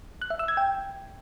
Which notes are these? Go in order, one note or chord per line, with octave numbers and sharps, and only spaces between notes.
F#6
E5
E6
G#6
G5